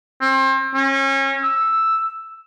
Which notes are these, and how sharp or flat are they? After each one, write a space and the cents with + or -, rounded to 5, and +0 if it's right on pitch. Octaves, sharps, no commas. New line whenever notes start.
C4 +35
C#4 -30
E6 +0